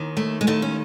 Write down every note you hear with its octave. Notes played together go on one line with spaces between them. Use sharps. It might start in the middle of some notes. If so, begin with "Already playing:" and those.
Already playing: D#2 D#3
A3
G#3
D#2 D#3 A3
C#4